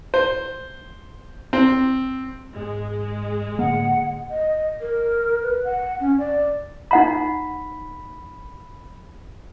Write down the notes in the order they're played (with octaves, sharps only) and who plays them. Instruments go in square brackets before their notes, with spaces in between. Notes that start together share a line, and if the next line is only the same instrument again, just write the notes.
[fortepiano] C5
C4
[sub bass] G#2 [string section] G#3
[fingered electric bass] A2 A#3 [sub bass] D3 [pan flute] F#5
[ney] D#5
A#4
B4
F#5
C#4
D5
[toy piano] D#4 F#5 A#5 [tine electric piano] B5